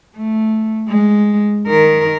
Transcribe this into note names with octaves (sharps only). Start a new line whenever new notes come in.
A3
G#3
D#3 A#4